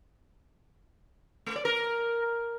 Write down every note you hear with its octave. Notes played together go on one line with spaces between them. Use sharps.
A3
D5
A#4